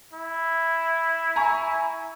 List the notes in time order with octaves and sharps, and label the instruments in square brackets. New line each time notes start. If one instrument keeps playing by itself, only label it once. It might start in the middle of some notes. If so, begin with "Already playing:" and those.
[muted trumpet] E4
[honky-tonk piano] G#5 A#5 C#6